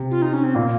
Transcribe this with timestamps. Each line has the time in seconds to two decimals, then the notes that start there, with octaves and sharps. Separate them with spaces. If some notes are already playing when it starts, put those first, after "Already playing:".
Already playing: C3
0.11 F4
0.22 D#4
0.33 C#4
0.44 C4
0.55 A#2 A#3